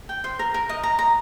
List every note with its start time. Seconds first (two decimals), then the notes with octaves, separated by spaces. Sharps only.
0.09 G5
0.24 C5
0.39 A#4
0.54 A#4
0.69 D#5
0.83 A#5
0.99 A#5